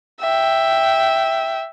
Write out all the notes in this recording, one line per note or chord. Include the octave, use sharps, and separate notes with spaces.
E5 G5